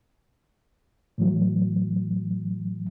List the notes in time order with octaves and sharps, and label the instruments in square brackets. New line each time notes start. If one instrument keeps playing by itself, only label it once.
[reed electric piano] A2 E3 F#3